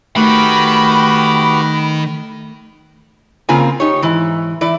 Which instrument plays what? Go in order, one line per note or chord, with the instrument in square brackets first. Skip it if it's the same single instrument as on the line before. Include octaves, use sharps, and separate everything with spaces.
[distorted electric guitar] D#3 [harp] A3 [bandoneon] F#4 G4 B4 [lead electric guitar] B5
[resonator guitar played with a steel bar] C#3 A#3 C4 F4 A#4 G#5
D#4 G4 C#5
G#2 E3
E3 E4 D5